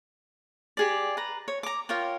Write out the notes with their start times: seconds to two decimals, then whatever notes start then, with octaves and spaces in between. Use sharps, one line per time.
0.77 G4 G#4 D5
1.17 B4 A#5
1.48 C#5
1.63 A#5 D6
1.89 F4 A#4 C#5 G5